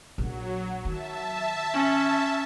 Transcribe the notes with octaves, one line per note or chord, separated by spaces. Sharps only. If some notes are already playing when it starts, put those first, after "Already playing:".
A#1 F#3
D#3 E5 A5
C#4